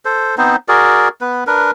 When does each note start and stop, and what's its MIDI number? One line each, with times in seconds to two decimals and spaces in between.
0.05 0.35 69
0.05 0.35 72
0.38 0.56 59
0.38 0.56 60
0.38 0.56 63
0.38 0.56 72
0.68 1.08 66
0.68 1.08 68
0.68 1.08 70
0.68 1.08 74
1.21 1.44 59
1.21 1.44 71
1.47 1.71 62
1.47 1.71 70
1.47 1.71 71